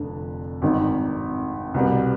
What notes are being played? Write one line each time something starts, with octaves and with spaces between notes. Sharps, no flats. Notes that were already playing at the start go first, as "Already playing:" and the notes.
Already playing: F1 F2 D3
G#1 G2 D#3
C2 B2 G3 B3